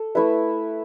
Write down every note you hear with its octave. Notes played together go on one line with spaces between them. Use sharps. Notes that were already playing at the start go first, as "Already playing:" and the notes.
Already playing: A4
A3 E4 B4 E5